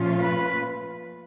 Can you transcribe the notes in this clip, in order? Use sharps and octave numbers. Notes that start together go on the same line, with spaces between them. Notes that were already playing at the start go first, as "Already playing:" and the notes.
Already playing: A#2 F3 A3 C#4 F4
B4